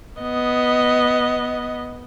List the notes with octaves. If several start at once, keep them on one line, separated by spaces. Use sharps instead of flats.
B3 D#5